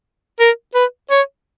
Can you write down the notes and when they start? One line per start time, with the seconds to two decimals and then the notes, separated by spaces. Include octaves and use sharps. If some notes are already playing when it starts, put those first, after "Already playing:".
0.40 A#4
0.74 B4
1.10 C#5